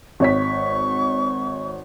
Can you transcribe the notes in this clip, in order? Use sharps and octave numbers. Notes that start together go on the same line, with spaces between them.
G#1 C#5 C#6 B6